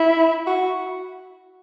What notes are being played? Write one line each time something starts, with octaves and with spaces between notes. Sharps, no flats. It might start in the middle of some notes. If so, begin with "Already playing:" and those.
Already playing: E4
F#4